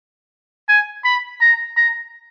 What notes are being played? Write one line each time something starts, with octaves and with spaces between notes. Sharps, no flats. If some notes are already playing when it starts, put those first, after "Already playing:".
G#5
B5
A#5
A#5